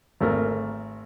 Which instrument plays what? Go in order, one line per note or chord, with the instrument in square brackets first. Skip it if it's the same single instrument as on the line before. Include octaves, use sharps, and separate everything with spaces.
[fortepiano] G#1 A3 A#4